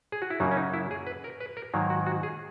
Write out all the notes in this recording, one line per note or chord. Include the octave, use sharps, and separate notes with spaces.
G#4
F#4
E4
F#2 C#3 F#3 A#3 D#4
C#4
D#4
E4
G#4
B4
A#4
B4
A#4
G#2 D#3 F#3 A#3
F#4
F#4
G#4